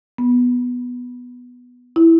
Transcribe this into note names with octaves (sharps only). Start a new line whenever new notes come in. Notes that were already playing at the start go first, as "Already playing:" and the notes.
B3
E4